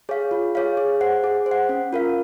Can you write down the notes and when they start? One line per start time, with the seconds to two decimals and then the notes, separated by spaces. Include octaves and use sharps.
0.09 G#4 C#5 F5
0.31 F4
0.55 G#4 C#5 F5
0.77 G#4
1.01 C5 F#5
1.24 G#4
1.46 C5
1.51 F#5
1.69 C#4
1.93 F4 A#4 F5